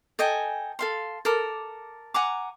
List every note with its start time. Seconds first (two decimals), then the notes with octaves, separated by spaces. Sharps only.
0.19 A4 D#5 G5 G#5
0.79 A4 F5 C6
1.25 A4 A#4 D6
2.14 F#5 G#5 A#5 D6